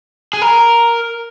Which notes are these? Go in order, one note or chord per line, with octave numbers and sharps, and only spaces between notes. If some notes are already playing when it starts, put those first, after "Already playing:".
G#4
A#4